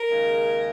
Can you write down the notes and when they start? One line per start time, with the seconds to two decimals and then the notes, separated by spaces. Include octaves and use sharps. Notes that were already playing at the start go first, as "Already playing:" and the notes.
Already playing: A#4
0.10 D#2 C#3 G#3